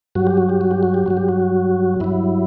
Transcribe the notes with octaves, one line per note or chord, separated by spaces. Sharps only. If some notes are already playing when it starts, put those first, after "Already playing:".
G2 F#3 F#4
G4
F#4
G4
F#4
G4
F#4
G4
G2 F#3 F#4
G4
F#4
G2 F#3 E4